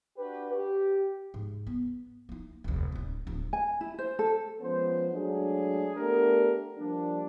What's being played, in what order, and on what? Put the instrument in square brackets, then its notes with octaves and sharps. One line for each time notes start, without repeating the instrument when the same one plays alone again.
[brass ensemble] D4 F#4 G4 B4
G4
[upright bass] G#2
B3
A#3 D#4
F1 D2
D1 D4
D1 D4
[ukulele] G#5
E4
C5
A4
[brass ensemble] F3 G#3 B3 C#4 C5
F#3 G#3 A3 D4 G#4
A3 B3 D4 G4 A#4
F3 G3 A#3 D4